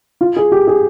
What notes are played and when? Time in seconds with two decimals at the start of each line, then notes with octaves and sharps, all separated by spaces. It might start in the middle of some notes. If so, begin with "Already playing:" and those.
0.21 F4
0.37 G#4
0.52 G4
0.67 G#4